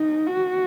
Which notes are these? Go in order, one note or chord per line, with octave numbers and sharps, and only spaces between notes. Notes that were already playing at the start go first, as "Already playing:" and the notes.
Already playing: D#4
F#4